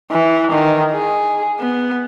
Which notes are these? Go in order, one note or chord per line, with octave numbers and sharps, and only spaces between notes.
E3
D#3
G#4
B3